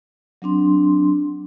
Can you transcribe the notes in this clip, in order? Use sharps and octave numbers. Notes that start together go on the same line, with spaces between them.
F#3 C4 D4 C6